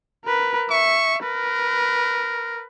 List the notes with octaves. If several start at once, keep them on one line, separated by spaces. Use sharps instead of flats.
A#4 B4
E5 C#6
A#4 B4